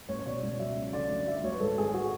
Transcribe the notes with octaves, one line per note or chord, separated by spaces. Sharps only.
A1 C#5
C#5
B2 D5
C#2
F#3 E5
C#2
D3 D5
D2
F#3 E5
D5
D2 C#5
B4
G#2 A4
G#1 G#4
G#3 F#4